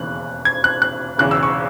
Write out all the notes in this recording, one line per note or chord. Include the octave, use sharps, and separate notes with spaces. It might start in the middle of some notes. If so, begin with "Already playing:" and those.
Already playing: E1 D#2 C#3 E3 F#6
G#6
F#6
F#6
E1 E2 C#3 E3 F#6
E6
C#6